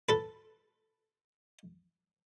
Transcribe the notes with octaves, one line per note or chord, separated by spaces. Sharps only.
A4 B4